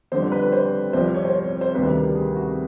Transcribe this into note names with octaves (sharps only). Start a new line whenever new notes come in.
F2 D3 G3 C5
B4
C5
C2 C3 F3 C5
C#5
C5
C#5
C5
D2 C3 D#3 G3 B4
A#4
G#4
F#4